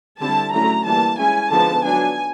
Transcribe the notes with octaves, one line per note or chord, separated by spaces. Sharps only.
D3 G3 C4 E4 A5
D3 F#3 A3 C#4 E4 A#5
E3 G3 A#3 A5
G#3 C#4 E4 G#5
D3 F3 G#3 B3 D#4 A5
F#3 B3 D4 G#5